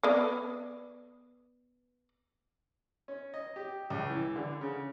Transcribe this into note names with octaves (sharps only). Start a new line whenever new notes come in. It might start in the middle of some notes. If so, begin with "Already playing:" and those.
B3 D5
C#4
D#5
G4
C#2
E3
D3
C#3